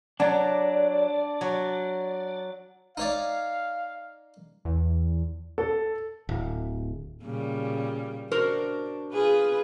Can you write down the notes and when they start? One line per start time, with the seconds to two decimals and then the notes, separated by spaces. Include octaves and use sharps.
0.20 F#3 D4 D5
1.41 F#3
2.97 D#4 C#5 D5 F5
4.65 E2
5.58 A4
6.29 D1
7.23 A#2 C#3 G3
8.31 D4 F#4 A#4 C5
9.12 F4 G#4 B4